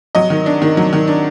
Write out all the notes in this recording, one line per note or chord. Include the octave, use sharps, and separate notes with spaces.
F#3 D#5
D#3
D4
D#3
F#3
D#3
D4